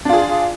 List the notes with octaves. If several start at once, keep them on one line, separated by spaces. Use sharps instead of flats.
D4 F4 G#4